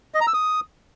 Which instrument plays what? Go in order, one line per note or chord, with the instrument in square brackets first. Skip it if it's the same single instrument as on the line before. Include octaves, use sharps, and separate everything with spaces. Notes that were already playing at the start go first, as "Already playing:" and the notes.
[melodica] D#5
A#5
E6
D#6